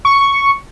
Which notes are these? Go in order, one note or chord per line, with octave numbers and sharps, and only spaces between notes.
C#6